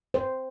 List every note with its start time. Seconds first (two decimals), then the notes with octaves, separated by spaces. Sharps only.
0.14 C5